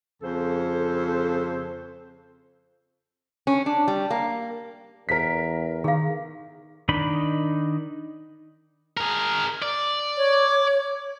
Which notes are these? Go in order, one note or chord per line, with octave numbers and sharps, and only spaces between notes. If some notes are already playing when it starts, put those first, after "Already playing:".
F2 C#3 A4 C5
C#4
D4
G3
A#3
E2 A#4 B6
D#3 G#4 F5
D#3 D4 D#4 D#5 B5
G#4 A#4
D5
C#5